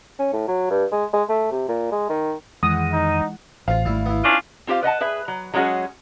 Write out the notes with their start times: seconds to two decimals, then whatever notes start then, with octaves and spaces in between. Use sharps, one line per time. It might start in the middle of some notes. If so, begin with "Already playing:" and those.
0.19 C#4
0.33 A2
0.48 F#3
0.70 G2
0.91 G#3
1.13 G#3
1.29 A3
1.51 C3
1.68 A#2
1.92 G#3
2.09 D#3
2.63 F2 D#3 E3 G#3 F#5 D#6
2.92 D#4
3.68 A1 F4 C5 F5
3.85 G#1 G3 A3 E4
4.06 B3 E4
4.24 C#4 D4 F4
4.67 C4 F4 G4 C5 F5
4.83 B4 D#5 F#5 A5
5.01 G#4 B4 E5
5.28 F#3
5.54 F#3 G#3 C#4 F#4 G#4